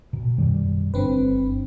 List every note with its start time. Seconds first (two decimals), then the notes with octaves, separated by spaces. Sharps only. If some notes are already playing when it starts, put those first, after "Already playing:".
0.13 A#1 B2
0.38 F#2 D#3 G3
0.94 G1 D3 C4 B4